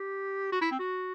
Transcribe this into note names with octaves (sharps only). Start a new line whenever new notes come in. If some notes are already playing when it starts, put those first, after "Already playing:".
Already playing: G4
F#4
E4
C4
F#4